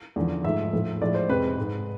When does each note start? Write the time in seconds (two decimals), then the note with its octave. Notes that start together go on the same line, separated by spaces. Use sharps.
0.16 E2 D3 F3
0.44 G#2 F3 A3 E5
0.73 A2 F3 A3
1.02 A2 F3 G#3 D5
1.15 C5
1.29 F2 C3 G#3 B4
1.58 G#2 G#3